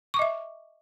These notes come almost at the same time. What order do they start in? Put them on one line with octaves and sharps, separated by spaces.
C#6 D6 D#5 E5